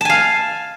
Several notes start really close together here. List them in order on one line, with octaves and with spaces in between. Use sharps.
A5 G#5 F5